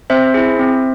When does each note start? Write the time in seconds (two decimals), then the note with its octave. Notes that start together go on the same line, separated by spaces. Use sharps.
0.10 C4 C5 E5
0.34 E4 G#4
0.59 C4